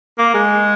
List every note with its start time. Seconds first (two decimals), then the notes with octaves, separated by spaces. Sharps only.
0.18 A#3
0.34 G#3